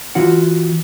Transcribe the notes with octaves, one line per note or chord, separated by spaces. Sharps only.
E3 F4 F#4 F#5